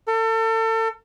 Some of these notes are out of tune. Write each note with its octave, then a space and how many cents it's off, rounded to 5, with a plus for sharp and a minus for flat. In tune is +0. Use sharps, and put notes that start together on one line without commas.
A4 +35